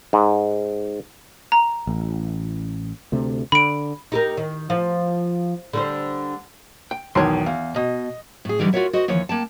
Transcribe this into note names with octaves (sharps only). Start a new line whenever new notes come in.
G#2
A#5
A1
D2 C3 A3
D3 B5 D7
D#4 G4 A#4
D#3
F3
D3 G3 C5
G5
B1 E2 D#3 C#5 C6
E2 F5
B2 D#5
A2 G#4
D3 E3 F#3 G3 D#4
F4 F#4 A4 A#4 C#5 E5
F#4 C5 D#5
D#2 E3 F3 C#5
A#3 G5 A5